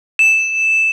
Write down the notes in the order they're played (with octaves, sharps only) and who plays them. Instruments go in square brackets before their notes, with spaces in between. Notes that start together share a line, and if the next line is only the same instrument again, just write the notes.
[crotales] E7